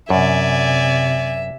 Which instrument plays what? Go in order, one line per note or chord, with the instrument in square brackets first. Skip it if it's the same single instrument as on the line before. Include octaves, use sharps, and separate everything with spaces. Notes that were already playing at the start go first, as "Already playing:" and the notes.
[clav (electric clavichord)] F#2 [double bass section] C3 [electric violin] D5 G#5 [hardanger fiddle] E5